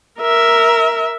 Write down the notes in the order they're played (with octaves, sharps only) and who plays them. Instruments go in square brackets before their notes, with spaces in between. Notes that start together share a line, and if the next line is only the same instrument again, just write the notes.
[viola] A#4 E5